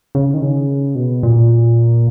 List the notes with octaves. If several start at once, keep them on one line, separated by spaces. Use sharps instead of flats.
C#3
D#3
C#3
B2
A#2